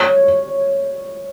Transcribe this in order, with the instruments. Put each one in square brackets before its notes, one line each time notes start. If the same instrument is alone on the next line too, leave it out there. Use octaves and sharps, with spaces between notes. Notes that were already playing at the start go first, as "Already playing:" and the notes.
Already playing: [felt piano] C#5